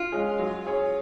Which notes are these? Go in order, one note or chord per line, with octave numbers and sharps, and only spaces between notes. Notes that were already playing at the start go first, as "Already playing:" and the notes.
Already playing: F4
G#3 C#4 G#4
F#3
C#4 G#4 C#5